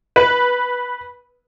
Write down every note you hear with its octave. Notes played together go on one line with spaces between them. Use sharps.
B4